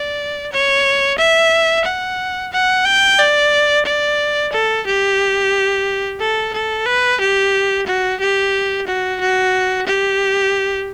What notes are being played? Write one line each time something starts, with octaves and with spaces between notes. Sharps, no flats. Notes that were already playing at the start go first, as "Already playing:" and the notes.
Already playing: D5
C#5
E5
F#5
F#5
G5
D5
D5
A4
G4
A4
A4
B4
G4
F#4
G4
F#4
F#4
G4